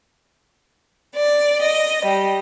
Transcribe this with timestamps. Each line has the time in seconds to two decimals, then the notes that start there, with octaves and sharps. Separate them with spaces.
1.16 D5
1.62 D#5
2.05 G3